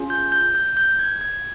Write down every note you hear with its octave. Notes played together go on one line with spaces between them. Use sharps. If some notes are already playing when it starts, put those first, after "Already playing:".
Already playing: C#4 F4 G#4
G6
G6
G6
G6
G#6
G#6